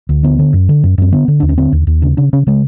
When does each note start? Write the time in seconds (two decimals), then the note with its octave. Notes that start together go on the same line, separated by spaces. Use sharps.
0.09 D2
0.23 D3 B3
0.39 D3
0.53 F#2
0.69 D3
0.83 F#2
0.98 F#2 C4
1.12 D3 B3
1.28 D3
1.40 D#2 D4
1.49 C#4
1.58 D3 C4
1.72 D#2
1.87 D#2
2.02 C#3 D4
2.17 C#3 D4
2.33 C#3 C#4
2.47 C#3 G#3